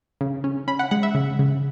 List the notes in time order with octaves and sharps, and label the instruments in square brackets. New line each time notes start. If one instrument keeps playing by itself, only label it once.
[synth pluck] C#3
C#4
C#4 B5
F#5
G#3 F#5
E5
C#3
C#3